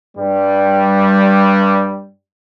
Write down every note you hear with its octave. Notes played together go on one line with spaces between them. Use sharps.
G2 G3